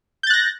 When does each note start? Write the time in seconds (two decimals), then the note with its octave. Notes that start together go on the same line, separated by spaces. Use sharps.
0.23 G6
0.27 A6
0.30 F#6
0.34 A#6